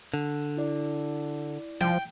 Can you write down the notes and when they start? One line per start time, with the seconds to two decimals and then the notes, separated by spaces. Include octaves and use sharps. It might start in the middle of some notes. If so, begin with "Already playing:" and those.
0.14 D3
0.57 E4 D5
1.81 F3 G5